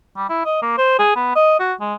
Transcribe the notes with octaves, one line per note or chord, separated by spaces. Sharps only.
G3
E4
D#5
A#3
C5
G#4
B3
D#5
F#4
G#3